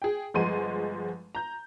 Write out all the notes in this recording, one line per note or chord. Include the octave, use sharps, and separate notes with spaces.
G#4 G5
G1 F3 G#3 F#5 C6 D#7
A#5 G6